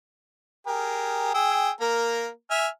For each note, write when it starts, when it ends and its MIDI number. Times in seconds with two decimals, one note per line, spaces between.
0.67 1.33 67
0.67 1.33 68
0.67 1.33 70
1.34 1.70 68
1.34 1.70 79
1.34 1.70 88
1.81 2.28 58
1.81 2.28 70
2.50 2.67 76
2.50 2.67 80
2.50 2.67 89